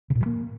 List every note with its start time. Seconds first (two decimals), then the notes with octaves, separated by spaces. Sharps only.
0.10 C#3
0.15 A#2
0.21 G2
0.26 A#3